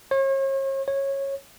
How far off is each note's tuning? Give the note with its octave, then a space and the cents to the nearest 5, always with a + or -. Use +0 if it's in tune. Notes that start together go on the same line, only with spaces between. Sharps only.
C#5 -40
C#5 -15